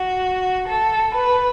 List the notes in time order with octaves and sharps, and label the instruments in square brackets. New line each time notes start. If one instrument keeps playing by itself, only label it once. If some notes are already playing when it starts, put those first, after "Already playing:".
Already playing: [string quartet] F#4
A4
B4